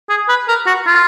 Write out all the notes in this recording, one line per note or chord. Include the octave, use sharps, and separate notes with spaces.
G#4
B4
A#4
F#4
F4